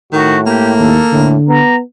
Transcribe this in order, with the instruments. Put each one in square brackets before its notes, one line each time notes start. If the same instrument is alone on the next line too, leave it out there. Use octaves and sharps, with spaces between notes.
[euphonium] A2 [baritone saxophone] D#3 [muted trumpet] F#4
[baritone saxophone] A#3 [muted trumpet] G4
[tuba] D#2 [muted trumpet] A4
[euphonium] A2 [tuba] D3
[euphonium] B3 [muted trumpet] A#5